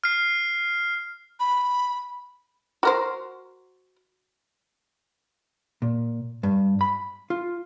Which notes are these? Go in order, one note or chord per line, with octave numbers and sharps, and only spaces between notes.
F6 C7
B5
F#4 A#4 C5
A#2
G2
B5
F4